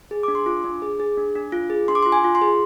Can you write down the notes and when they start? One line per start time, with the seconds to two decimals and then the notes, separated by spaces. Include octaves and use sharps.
0.11 G#4
0.23 D4 D6
0.35 C6
0.46 F4 D6
0.64 D4
0.82 G#4
1.00 G#4
1.17 D4
1.35 D4
1.52 F4
1.70 G#4
1.88 D4 C6
1.95 D6
2.03 F4 C6
2.12 G#5
2.24 F4
2.35 C6
2.41 G#4